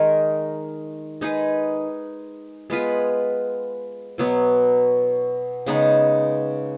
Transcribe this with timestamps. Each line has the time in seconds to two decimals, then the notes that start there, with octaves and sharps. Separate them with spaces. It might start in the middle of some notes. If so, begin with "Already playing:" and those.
Already playing: D#3 G#3 D#4 A#4
1.21 G#3 D#4 G#4 B4
2.70 G#3 B3 F4 B4
4.18 B2 F#3 B3
5.66 C#3 G#3 B3 D#4